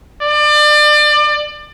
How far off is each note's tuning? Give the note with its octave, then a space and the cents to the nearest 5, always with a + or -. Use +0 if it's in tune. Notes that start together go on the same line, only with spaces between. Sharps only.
D5 +30